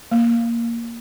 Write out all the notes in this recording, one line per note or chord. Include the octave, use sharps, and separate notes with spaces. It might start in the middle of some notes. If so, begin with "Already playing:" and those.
A#3